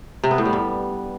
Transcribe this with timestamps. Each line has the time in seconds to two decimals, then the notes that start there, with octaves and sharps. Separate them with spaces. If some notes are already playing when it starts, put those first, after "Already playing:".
0.23 C3
0.31 B3
0.38 A2
0.45 G3
0.53 G2